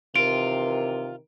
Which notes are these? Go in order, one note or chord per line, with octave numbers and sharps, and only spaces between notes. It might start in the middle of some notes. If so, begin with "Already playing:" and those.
C3 D#3 E3 F4 A#4 D7